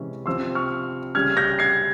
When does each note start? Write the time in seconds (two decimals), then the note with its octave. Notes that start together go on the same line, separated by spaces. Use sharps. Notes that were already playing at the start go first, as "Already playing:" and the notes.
Already playing: C3 E3 G#3 C#4
0.26 C3 F3 C4 C6 E6
0.55 C#6 F6
1.15 C#3 G3 C#4 F6 G#6
1.37 G6 A#6
1.59 G#6 C7